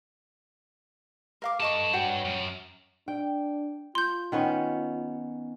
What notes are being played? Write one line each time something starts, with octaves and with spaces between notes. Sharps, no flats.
A#4 F5 D6
G2 A4 D#5 A5 C#6
F#4 C#5 G5
F#2
D4 G5
F4 C6 G6
D#3 B3 C#4